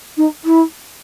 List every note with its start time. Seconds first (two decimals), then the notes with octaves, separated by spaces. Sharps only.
0.17 D#4
0.44 E4